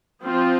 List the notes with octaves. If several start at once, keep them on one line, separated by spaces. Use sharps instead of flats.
F3 C4 F4